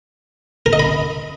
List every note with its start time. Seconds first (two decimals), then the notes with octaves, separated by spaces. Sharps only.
0.66 A#4
0.73 D#5
0.79 B5